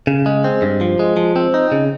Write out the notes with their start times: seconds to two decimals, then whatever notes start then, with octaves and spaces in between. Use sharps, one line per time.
0.07 C#3
0.26 G#3
0.44 C4
0.62 G2
0.81 F3
0.99 G#3
1.17 F3
1.36 C4
1.54 D#4
1.72 C#3